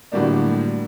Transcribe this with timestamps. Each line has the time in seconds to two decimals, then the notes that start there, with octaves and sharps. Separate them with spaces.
0.12 A2 D3 F#3 G3 A#3 D4